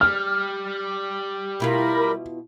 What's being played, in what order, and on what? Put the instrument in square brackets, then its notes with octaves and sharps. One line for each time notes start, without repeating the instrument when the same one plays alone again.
[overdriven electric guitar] G3 [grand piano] F6
[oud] B2 E4 F4 [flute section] A#4 B5